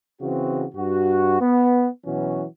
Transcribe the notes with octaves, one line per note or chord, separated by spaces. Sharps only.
C#3 E3 C4 F#4
G2 F#4
B3
B2 E3 F#3 C#4 F#4